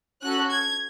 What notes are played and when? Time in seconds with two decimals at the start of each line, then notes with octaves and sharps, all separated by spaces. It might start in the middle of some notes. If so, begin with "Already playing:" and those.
0.22 C#4 F#4 A4 F#6
0.50 G#6